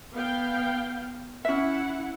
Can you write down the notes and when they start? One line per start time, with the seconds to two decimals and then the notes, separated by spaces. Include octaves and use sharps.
0.14 B3 F5 G5
1.45 C#4 E4 E5 F#5